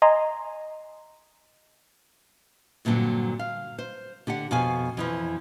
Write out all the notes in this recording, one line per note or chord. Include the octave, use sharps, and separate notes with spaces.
D#5 G#5 A#5 C6
G2 A#2 D3 F#3 C4
F5
C5
D3 G4 D5 F#5
F2 B2 F5 G#5
F2 E3 F3